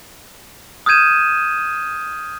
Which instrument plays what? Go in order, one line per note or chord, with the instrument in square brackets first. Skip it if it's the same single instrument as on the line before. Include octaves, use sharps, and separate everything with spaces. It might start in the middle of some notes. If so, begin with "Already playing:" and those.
[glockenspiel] D#6 F6 G6 G#6 D#7 E7